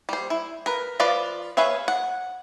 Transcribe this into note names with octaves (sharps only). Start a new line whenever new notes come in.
G3 C5
E4
A#4 B4
F3 F4 B4 D5
G#4 B4 C#5 E5 F5
F#5